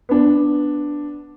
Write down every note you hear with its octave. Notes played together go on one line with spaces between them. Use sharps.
B3 D4